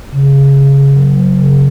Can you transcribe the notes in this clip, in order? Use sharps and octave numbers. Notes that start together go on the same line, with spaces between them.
C#3
C#3
C#3
C#3
F#3
F#3
C#3